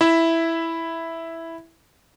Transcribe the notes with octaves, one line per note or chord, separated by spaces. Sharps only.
E4 E5